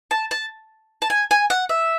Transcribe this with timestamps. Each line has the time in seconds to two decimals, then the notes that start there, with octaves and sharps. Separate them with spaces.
0.11 A5
0.31 A5
1.02 A5
1.10 G#5
1.31 G#5
1.50 F#5
1.69 E5